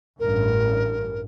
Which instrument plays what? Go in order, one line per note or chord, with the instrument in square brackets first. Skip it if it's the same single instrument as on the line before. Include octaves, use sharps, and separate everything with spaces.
[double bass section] A1 G2 [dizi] A#4